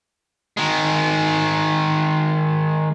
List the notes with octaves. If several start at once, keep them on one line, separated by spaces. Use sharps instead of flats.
D#3 G#3